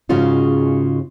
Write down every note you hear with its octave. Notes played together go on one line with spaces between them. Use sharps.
G#2 C#3 G#3 C#4 F4 F#4